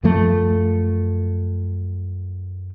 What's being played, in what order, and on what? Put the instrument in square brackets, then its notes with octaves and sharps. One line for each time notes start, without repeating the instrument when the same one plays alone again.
[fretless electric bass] F#2 F3 A3